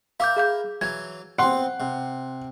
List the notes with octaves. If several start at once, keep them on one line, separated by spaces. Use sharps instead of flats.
E4 A#4 F5 D6 G6
G#4 F5 G6
E3 F#3 G#6
B3 C4 F#5 C6
C3